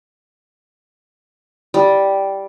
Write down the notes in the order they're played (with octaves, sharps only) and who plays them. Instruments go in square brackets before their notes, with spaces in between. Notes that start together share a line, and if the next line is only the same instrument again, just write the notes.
[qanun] G3